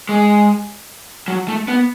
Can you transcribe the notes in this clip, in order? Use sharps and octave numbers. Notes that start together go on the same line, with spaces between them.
G#3
F#3
A3
B3